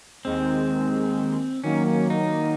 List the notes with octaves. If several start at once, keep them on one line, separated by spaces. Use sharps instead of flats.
D#2 D#3 G#3 C4
D#3 F#3 A#3 C#4
C#4
D#4